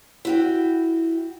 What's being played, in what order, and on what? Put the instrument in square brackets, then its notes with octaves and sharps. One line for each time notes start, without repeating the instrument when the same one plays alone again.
[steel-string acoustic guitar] E4 F#4 G5